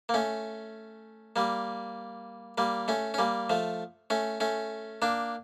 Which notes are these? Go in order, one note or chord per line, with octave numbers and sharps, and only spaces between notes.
A#3
A3 C#4
G3 A#3
G3 A#3
A3 C#4
C#4
G3 A#3
F3 A3
A3 C#4
A3 C#4
A#3 D4